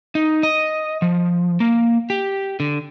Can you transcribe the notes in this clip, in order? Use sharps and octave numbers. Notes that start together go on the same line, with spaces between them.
D#4
D#5
F3
A#3
G4
D3